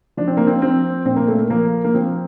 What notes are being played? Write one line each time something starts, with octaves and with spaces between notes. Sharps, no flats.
F3 D4
C4
A#3
C4
F3 C4
A#2 C4
A#3
A3
A#3
F3 A#3
A#3
F3 C4